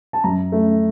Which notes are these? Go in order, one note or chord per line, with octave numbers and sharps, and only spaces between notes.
A5
F#2 A#5
A3